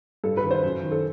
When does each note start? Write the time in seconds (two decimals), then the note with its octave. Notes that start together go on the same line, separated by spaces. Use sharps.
0.24 G2 A4
0.37 B4
0.43 D#3
0.51 C5
0.63 F#2
0.83 D#3
0.91 A4